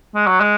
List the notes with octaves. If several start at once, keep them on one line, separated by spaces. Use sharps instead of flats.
G#3
F#3
G#3